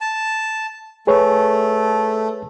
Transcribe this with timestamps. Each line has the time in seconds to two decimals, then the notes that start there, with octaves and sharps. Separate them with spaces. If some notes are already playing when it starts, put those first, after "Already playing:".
0.01 A5
1.07 A3 G#4 B4 C#5